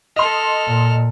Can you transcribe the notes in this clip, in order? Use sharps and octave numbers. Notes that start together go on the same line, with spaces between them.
A4 D#5 C6 F6
A#2